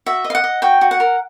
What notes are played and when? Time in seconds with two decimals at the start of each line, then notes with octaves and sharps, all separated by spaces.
0.06 F#4 E5
0.24 D#5
0.30 F5
0.35 F#5
0.44 D#5
0.62 F#4 G5
0.81 F#4
0.91 F#5
1.00 A#4